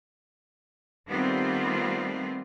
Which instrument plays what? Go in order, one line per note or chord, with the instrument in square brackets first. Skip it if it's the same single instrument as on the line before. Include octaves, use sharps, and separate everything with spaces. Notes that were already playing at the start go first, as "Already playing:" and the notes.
[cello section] D#3 G3 A3 B3 C4 F4